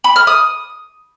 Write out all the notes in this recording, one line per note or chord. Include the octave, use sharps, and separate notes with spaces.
B5
F6
D#6